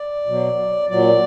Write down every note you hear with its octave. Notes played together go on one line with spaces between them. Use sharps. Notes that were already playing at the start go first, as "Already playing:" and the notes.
Already playing: D5
B2 F#3
A#2 F#3 D5